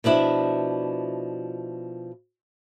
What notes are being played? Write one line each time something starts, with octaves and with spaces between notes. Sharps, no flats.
B2 F3 D4 E4